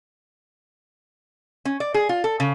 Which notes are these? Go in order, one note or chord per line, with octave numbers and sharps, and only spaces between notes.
C#4
D5
G#4
F4
A4
C#3